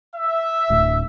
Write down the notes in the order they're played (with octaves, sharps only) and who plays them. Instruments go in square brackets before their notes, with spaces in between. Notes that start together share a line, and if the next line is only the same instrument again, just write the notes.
[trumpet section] E5
[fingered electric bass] D1 A2